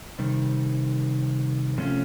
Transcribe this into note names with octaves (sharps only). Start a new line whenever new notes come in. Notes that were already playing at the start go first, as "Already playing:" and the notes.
C3 D#3 G3
C3 F3 A3 C#4 F4